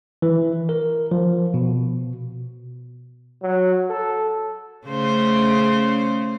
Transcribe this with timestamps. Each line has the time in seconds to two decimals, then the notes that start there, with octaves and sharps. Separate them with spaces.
0.22 E3
0.69 A#4
1.11 F3
1.54 B2
3.42 F#3
3.90 A4
4.87 C#3 A3 C5